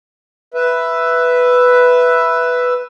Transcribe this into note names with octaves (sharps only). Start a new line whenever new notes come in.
B4 E5